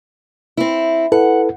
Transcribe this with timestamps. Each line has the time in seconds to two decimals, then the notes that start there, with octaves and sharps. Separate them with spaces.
0.57 C4 E4
1.12 E4 A4 B4 F#5